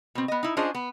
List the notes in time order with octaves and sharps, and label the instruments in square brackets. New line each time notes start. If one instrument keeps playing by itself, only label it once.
[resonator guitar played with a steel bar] B2 C4
B3 D#5
D#4 E4
C#4 D4 F4 G#4 C5 D#5
B3